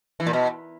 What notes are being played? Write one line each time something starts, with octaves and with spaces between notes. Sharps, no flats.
E3
A#2
B2